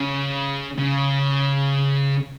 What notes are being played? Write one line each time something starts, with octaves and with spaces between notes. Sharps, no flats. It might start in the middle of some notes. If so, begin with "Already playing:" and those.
Already playing: C#3
C#3